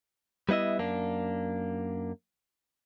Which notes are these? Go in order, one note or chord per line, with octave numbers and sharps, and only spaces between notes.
G3 B3 E4 D#5 E5
F#2 A#3 D4